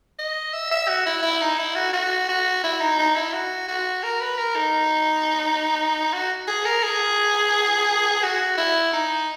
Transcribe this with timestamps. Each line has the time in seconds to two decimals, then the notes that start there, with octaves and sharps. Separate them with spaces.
0.19 D#5
0.53 E5
0.71 E5
0.88 F#4
1.06 E4
1.23 E4
1.41 D#4
1.58 E4
1.76 F#4
1.93 F#4
2.29 F#4
2.64 E4
2.80 D#4
2.99 D#4
3.15 E4
3.33 F#4
3.68 F#4
4.03 A#4
4.21 B4
4.38 A#4
4.56 D#4
6.13 F#4
6.48 G#4
6.65 A#4
6.83 G#4
8.23 F#4
8.57 E4
8.93 D#4